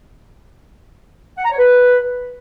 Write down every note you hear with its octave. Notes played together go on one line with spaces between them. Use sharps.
F#5
A#5
C#5
B4